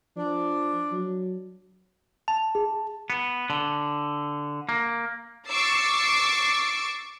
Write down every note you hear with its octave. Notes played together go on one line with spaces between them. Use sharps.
F3 D4
F#3
A5 F7
G#4
B3
D3
A#3
C#6 D6 E6 A6 C7 D7